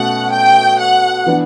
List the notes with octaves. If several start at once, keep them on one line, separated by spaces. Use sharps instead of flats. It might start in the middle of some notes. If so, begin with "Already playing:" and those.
Already playing: B2 A3 C#4 F#5
G5
F#5
E3 B3 D4